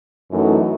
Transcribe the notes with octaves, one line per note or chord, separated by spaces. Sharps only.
F#2 E3 A3 D#4 F#4